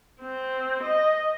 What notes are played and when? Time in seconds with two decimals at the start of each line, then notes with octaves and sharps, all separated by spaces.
0.21 C4
0.83 D#5